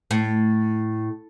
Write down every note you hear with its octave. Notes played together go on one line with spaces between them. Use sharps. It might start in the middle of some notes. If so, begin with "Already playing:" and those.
A2